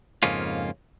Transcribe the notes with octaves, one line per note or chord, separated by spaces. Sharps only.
F2 G#2 C#3 A#3 C#4 F4